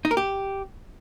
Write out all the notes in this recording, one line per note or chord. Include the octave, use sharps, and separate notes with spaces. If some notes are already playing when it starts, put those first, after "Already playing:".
D#4
A#4
G4